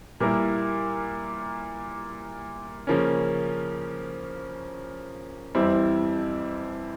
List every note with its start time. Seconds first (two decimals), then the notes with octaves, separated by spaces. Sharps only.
0.20 A#2 G3 A#3 E4 A#4
2.87 C#3 F3 A#3 C#4
5.55 F2 E3 G3 C4 E4